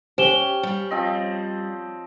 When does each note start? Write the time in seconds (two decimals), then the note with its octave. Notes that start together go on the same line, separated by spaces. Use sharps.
0.18 C#4 G4 C5 E7 G7
0.63 G3
0.91 F3 C4 D#5